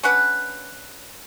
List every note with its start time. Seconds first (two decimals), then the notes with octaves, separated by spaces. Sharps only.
0.03 C#4 D4 B4 F#5